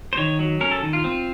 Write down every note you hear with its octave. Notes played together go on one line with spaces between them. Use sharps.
C5
D#3 C#5
F#3
C#4 A#4
A4
D#3
F4
C4